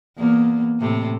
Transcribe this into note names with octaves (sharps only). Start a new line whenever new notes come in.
E2 A#3
A2 C3